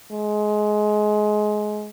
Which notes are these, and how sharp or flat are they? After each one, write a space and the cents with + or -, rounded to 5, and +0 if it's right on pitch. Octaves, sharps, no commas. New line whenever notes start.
G#3 +20